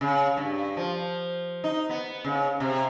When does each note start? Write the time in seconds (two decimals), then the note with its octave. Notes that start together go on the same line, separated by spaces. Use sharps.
0.01 C#3
0.37 G2
0.77 F3
1.64 D#4
1.89 B3
2.24 C#3
2.60 C3